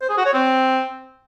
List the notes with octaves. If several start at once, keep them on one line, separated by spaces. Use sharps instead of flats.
C5
G#4
F#4
C#5
C4